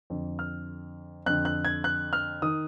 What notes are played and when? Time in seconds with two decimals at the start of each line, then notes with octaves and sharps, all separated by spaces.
0.10 F2 D3
0.39 F6
1.26 F2 D3 F#6
1.45 F#6
1.65 G#6
1.84 F#6
2.13 F6
2.42 D#3 D#6